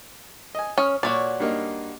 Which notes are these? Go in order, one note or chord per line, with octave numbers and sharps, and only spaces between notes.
D#5 G#5
C#4 C#5 D#6 F6
A#2 F#4 C#5 D5
G2 A#3 D#4